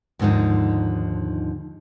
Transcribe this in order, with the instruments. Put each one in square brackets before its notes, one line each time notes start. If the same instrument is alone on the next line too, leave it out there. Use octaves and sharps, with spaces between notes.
[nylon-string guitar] D#2 G#2 D3 F3 D#4